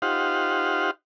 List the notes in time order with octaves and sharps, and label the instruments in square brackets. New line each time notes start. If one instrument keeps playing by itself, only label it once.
[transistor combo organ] D#4 F4 G4 C5 F5 F#5